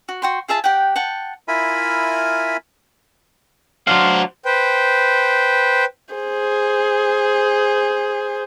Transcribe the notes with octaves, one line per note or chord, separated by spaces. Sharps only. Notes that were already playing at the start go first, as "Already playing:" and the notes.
F#4
F#4 G5 C6
F4 G#4 E5 A5
G4 D5 F#5 G5
F#5 G5 A5
E4 F4 A#4 E5 G#5 B5
F#3 D4 F#4 C5 F5
B4 C5 G5
G#4 C5